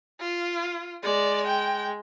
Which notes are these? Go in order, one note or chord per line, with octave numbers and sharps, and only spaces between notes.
F4
G#3 D5
G5